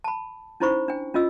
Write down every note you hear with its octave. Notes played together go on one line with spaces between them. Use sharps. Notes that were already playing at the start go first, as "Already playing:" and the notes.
A5 B5
C#4 D#4 E4 C5 B5 C#6
D4 G5
C#4 F4 D#5 E6